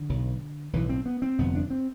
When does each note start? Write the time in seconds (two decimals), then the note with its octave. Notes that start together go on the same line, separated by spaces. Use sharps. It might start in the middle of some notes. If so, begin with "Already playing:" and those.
Already playing: D3
0.09 B1 B2
0.73 B1 A2 E3
0.89 C4
1.06 B3
1.22 C4
1.38 G1 F2 C3 B3
1.55 D4
1.70 C4